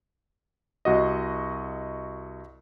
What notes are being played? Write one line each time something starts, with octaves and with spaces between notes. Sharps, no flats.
C2 F#4 D#5